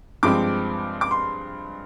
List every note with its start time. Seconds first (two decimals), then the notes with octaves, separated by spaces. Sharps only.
0.23 G2 F3 G#3 C4 D6
1.01 D6
1.11 C6